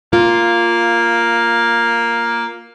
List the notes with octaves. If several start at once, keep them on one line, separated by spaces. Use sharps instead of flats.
A#3 F4